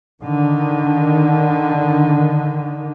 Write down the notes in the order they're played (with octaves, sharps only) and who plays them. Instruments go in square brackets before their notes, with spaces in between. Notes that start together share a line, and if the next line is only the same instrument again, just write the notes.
[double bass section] D3 D#3